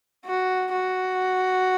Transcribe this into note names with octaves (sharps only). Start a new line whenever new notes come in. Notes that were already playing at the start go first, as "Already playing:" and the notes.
F#4
F#4